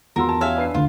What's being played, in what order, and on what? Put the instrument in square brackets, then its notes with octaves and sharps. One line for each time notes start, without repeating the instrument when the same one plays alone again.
[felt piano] E2 F#4 C6 [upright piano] F4 F#5 E6 [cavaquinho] A#4
[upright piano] A5
[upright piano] C#4 G4 [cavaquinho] E5 F5 G#5
[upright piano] D4 B4 C7
[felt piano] D2 D3 [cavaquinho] F4